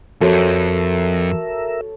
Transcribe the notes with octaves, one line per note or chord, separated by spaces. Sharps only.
F2 F#4 A4 A#4 C#5 E5